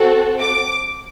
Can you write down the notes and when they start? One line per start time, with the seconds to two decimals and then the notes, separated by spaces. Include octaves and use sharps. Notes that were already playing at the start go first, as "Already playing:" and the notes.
Already playing: C4 F#4 A4
0.41 D6